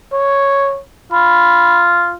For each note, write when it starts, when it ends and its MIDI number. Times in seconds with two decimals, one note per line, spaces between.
0.13 0.81 73
1.13 2.15 65
1.13 1.88 83